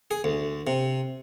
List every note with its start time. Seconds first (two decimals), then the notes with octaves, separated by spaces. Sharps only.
0.11 G#4
0.24 D2
0.67 C3